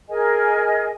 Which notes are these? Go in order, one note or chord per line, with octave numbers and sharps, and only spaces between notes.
G#4 A#4 D#5 G#5